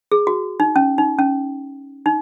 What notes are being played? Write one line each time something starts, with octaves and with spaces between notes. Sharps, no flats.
G#4
F#4
D#4
C#4
D#4
C#4
D#4